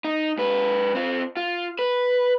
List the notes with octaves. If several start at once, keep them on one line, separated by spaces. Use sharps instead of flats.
D#4
G#2 B4
C4 F4
F4
B4